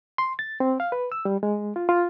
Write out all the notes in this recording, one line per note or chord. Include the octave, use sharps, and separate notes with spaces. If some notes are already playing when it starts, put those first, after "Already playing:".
C6
A6
C4
F5
B4
E6
G3
G#3
F4
F4